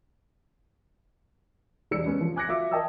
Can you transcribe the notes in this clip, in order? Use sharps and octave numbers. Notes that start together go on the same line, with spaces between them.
E1 G3 D4 E6 C#7
G#3 B3 C#4
F3
G#5 D6 F#6 G#6 A#6 C#7
F4 F#4 E5 D6 E6
A#4 D#5 G5 A5 D#6 E6